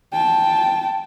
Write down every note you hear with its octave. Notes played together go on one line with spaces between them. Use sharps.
G5 A5